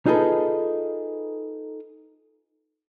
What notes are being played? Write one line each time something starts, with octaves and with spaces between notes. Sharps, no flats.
D#4 F4 G#4 A4 B4